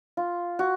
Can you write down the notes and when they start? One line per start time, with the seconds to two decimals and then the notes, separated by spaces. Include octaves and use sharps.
0.17 F4
0.59 F#4